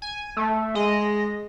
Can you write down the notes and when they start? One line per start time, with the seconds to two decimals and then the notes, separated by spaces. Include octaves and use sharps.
0.02 G#5
0.37 A3
0.75 G#3 D#5